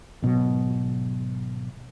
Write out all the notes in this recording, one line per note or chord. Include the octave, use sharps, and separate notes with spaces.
G#1 B2 F#3